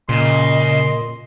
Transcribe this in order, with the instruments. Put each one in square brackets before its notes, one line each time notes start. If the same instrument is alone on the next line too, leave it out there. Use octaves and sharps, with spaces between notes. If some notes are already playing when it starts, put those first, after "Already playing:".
[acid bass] A#2 [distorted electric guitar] C#3 [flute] D#5 [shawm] C6